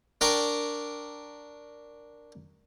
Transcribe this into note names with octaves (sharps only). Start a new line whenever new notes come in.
D4 A#4 G5 A#5 C#6 D6